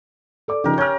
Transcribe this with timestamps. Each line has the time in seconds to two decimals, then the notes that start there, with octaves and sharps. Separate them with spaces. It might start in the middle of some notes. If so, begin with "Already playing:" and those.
0.48 A4 D5 D6
0.64 C#3 F3 D#4 G4 A#4
0.78 C#4 A#4 F6 G6